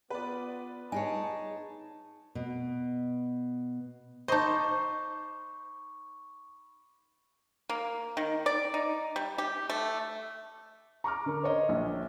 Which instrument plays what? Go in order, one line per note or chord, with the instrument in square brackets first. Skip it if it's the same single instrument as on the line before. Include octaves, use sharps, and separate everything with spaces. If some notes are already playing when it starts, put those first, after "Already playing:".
[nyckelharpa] B3 F4 [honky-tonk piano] B4 D5
[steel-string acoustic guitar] D#4 G#4 C#5 [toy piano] G#5 [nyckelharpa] A5
[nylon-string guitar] B2
[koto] D#4 D#5 [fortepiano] C5 A5 [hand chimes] B5 C#6 D6
[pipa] A#3
D#3
D5
D#4
G3
G4
A3
[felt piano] A#5 C#6 D6 F6
D3 A#4
C5 C#5 D#5
A#1